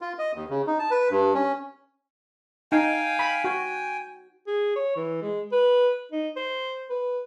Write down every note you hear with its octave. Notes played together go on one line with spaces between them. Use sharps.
F4
D#5
D#2
C#3
D#4
A5
B4
G2
C#4
D#4 F5 G5 G#5
B5
F#4 G5 G#5
G#4
C#5
E3
G#3
B4
D#4
C5
B4